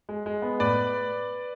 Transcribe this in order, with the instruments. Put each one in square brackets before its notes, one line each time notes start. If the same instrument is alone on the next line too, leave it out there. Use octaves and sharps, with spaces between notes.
[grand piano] G#3
G#3
B3
A2 B4 D5